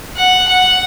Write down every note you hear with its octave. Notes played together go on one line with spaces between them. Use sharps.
F#5
F#5